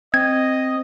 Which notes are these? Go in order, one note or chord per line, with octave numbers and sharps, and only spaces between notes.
C4 D#5 G#6